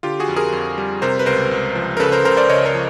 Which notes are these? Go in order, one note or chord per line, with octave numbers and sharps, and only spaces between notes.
D3 F4 G4
F#4 G#4
F2
G#4 A#4
F2
G3
C3 A#4 C5
B4
C#2 A#4 C5
C#2
F3
A#4
C#3 A4 B4
A#4 C5
C#2 A#4 C5
C5 D5
C#2 C#5 D#5
A#4 C5
F3